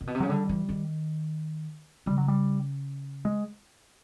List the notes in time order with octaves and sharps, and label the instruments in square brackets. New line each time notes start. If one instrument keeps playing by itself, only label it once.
[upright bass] A#2
B2
C3
[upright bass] C#3 [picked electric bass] F#3
[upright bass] D3 [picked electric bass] G3
[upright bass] E3
D#3
[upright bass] C#3 [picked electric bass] G3
[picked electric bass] F#3
G3
G#3